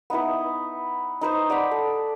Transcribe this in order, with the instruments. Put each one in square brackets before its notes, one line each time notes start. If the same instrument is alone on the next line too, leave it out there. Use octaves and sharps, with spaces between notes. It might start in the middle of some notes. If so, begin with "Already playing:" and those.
[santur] B3 D#4 E4 B4
D#4 B4 C5
D5 F#5 A#5 B5
A4